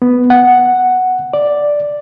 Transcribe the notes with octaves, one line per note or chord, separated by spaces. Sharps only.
B3
F#5
D5